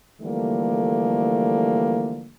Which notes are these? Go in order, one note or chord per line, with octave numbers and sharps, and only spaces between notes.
D3 E3 F3 G3 A3 A#3